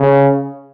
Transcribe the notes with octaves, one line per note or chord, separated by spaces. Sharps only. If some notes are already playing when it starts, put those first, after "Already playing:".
Already playing: C#3